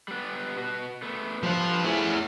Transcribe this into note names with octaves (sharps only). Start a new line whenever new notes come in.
G3 B3
B2 F#4
A3 B3
D3 F3 G3 B4 C5
A3 C#4 E4 G#4